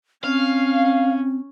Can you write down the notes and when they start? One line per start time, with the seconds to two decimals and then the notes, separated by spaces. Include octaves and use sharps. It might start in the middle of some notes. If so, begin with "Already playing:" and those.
0.24 C4 C#4 F5